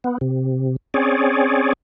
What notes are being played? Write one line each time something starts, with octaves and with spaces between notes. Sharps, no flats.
B3
C3
C4 C#4 G#4 C#5 D5